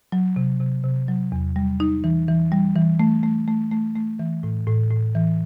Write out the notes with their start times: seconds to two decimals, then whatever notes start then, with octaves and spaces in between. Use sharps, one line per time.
0.12 F#3
0.36 C3
0.60 C3
0.84 C3
1.08 F#3
1.32 E2
1.56 G3
1.80 D#4
2.04 E3
2.28 E3
2.52 G3
2.75 E3
3.00 A3
3.23 A3
3.48 A3
3.71 A3
3.95 A3
4.19 E3
4.43 A2
4.67 A2
4.91 A2
5.15 E3